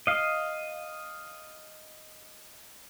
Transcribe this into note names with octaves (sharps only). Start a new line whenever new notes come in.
D#5 F5